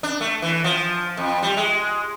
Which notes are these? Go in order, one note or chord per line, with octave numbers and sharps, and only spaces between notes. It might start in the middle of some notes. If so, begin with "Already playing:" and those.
D4
A3
E3
F3
F2
G3
G#3